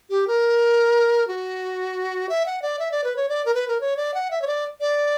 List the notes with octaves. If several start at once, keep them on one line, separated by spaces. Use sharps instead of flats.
G4
A#4
F#4
E5
F#5
D5
E5
D5
B4
C#5
D5
A#4
B4
A#4
C#5
D5
F#5
E5
C#5
D5
D5